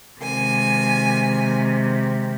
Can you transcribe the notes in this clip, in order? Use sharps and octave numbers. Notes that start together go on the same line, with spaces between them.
C3 D#3 G#3 G#5